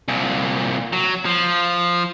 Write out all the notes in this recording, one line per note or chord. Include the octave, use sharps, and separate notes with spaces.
C2 A#2
F#3
F3